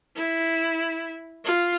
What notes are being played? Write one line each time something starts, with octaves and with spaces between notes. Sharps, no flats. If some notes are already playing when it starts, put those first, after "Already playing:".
E4
F4